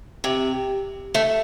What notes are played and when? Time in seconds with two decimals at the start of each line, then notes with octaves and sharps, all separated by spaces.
0.24 C3
1.14 A3